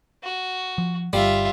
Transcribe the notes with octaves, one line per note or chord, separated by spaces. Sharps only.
F#4
F3
G1 G3 F4 E5